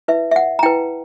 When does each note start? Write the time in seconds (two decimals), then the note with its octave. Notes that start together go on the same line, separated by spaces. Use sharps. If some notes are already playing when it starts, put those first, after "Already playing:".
0.08 E4 B4 E5
0.31 E5
0.36 F#5
0.59 A#5
0.63 E4 B4 G5